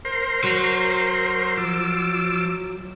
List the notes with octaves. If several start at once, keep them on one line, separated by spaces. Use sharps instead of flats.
A#4 C5 C6
F#3
F3 D6 E6